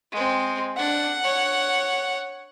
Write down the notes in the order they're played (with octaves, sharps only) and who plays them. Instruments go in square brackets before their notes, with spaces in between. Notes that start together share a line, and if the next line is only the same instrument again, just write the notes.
[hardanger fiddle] G#3 C4
[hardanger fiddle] D4 [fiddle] F#5
[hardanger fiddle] C#5